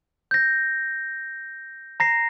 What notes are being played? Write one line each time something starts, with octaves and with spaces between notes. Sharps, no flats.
G6 A#6
A#5 A#6 C7